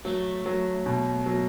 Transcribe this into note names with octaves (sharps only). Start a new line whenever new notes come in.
F#3 A3
F#3
B2
F#3